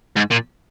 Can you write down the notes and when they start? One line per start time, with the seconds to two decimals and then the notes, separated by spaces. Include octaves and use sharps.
0.17 G#2
0.31 A#2